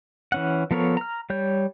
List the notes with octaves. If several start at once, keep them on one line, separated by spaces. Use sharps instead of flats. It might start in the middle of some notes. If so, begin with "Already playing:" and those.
E3 C#4 F#5
F3 B3 A4 A#4 C#5
A#5 F6
G3 C#5 G6